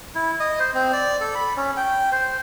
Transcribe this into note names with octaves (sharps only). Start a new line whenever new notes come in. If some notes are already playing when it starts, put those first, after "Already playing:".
E4
D#5
C5
C4
D5
A4
B5
C#4
G5
C5